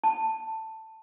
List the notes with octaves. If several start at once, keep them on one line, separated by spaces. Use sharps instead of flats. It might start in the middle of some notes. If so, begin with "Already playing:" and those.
A5